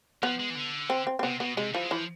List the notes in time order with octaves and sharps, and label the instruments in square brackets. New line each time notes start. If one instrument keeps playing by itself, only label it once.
[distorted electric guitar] F3 [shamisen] B3
[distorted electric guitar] G#3
E3
D3
[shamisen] C4
C4
C4
[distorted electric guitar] C3 [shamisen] B3
[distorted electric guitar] B2 [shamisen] B3
[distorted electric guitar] C3 [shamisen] G#3
[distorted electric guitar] E3 [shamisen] F3
[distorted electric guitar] G#3
[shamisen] E3 [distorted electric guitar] F3